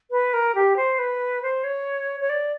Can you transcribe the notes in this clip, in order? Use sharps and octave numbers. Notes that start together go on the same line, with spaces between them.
B4
A#4
G4
C5
B4
C5
C#5
C#5
D5